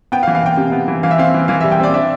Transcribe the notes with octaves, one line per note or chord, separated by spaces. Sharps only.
B3 G5
F5
E3
F5
B3 G5
C3
B3
E3
E3 F5
E5
C4 F5
E3
E3 F5
E5
G3
G5
C4 D5
D4 E5